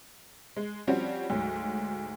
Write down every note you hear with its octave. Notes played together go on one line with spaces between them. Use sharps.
G#3
F3 G3 C4 C#4 F#4
D2 G#2 F#3